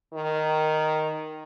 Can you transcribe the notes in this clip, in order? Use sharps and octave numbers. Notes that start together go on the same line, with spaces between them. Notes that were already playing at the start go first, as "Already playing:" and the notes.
D#3